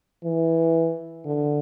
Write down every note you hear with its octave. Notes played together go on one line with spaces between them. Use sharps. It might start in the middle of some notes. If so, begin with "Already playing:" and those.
E3
D3